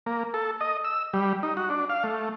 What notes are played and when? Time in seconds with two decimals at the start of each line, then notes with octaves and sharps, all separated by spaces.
0.06 A#3
0.34 A4
0.61 D#5
0.84 E6
1.14 G3
1.43 D#4
1.57 F#4
1.70 D4
1.90 F5
2.04 A3